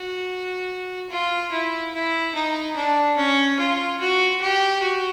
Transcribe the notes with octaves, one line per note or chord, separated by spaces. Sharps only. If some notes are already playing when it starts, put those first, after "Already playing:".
Already playing: F#4
F4
E4
E4
D#4
D4
C#4
F4
F#4
G4
F#4